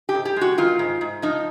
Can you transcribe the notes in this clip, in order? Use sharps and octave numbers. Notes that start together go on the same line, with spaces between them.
G4
G#2
G4
G#3 F#4
D#3 F4
G#2
G#2
F3 D#4